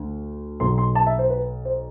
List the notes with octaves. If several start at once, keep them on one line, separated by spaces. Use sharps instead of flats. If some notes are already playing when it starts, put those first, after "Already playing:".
Already playing: D2 D3
B1 B2 C6
C6
A5
E5
C5
B4
C5